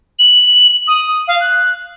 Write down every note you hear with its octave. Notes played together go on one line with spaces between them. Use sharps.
F#7
D#6
F5
F#6